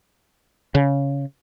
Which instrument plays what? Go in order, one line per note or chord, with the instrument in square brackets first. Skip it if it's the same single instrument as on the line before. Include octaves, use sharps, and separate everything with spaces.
[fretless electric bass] C#3